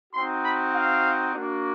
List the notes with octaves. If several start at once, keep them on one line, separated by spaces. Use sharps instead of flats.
C4 D#4 F#4 C6
B5
F5
A#3 D4 F#4